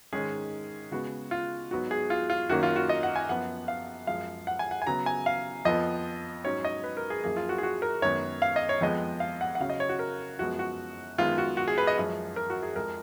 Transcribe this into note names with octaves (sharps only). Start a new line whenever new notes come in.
G#2 D#3 G#3 C#4 G#4
C#3 G#3 B3 F#4
F4
G#2 F#3 B3 F#4
G#4
F4
F4
F#2 D#3 A#3 C#4 F#4
F4
F#4
D#5
F#5
G#5
F#2 F3 B3 F#5
F5
F#2 F3 G#3 F5
F#5
G#5
F#5
G#5
C#3 F#3 B3 A#5
G#5
F5
F2 F3 B3 D#5
G#2 F#3 C#4 C#5
D#5
B4
A#4
G#4
F#2 F3 A#3 G#4
F4
F#4
G#4
F#4
A#4
F#2 D#3 G#3 B3 C#5
F5
D#5
C#5
F2 F3 G#3 B3 D#5
F5
F#5
F#5
C#3 F#3 C#4 F5
D#5
C#5
F#4
A#4
F#2 F3 G#3 B3 F#4
F#4
F#2 D#3 G#3 B3 F4
F#4
F#4
G#4
B4
D#5
F#2 F3 G#3 C#4
A#4
F#4
G#4
F2 F3 G#3 A#4